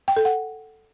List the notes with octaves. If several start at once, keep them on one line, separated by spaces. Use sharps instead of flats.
G5
A4
F#5